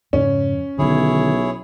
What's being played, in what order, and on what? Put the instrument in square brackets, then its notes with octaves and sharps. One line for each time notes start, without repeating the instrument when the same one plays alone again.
[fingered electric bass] F2 G#2 C#3 [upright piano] C#4
[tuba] B1 [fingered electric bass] D3 D#3 [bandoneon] E4 G#4 C#5